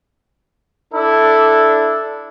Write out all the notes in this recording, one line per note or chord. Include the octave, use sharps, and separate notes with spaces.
D4 E4 A4